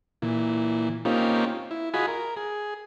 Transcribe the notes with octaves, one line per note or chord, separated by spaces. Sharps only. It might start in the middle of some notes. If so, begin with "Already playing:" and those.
A#2 E3
A#3 C4 C#4 D#4 F4 G4
E4
F4 F#4 G#4 D#5 G#5 B5
A#4
G#4